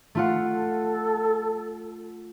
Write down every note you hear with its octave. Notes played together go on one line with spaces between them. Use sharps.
A3 F4 F#5
A4